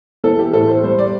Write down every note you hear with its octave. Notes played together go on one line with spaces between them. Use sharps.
E3 A4
G4
A2 A4
C5
G3 C5
D5